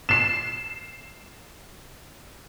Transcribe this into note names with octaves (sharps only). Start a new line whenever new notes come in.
C7 E7